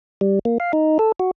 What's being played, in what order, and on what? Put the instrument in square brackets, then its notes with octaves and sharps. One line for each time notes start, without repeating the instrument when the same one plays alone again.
[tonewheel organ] G3
A#3
F5
D#4
A4
F#4